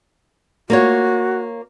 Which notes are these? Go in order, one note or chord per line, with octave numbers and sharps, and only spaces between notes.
A#3 F4 F#4 C#5